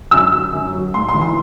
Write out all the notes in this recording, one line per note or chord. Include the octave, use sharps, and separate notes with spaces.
F#2 E6
F#3
F#2
F#3
A2 C6
C6
E3
C6